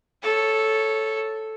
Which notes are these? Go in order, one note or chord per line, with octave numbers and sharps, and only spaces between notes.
A4 C#5